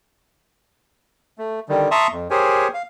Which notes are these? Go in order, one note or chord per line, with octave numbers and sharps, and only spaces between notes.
A3
D3 D#3 G3
E5 A5 A#5 C6 C#6 D#6
F2
G4 G#4 A#4 C5 C#5 G#5
F5